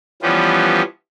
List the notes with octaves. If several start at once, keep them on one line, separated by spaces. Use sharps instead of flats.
E3 F3 G3 B3 C#4 F4